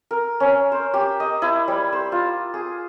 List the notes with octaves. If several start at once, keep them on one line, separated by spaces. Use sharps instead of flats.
A#4
C#4
C5
G4
D#5
E4
G3
C5
F4
G#4